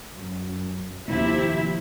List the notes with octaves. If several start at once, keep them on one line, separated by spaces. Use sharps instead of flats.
F#2
D#2 C3 F3 E4 G4 E5